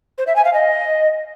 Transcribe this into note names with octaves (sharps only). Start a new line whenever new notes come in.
C5
E5
G#5
F5
D#5